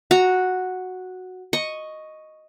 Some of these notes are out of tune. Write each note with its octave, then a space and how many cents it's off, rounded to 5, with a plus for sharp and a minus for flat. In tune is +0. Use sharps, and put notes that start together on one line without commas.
F#4 -5 A#5 +0
D#5 +0 C#6 +0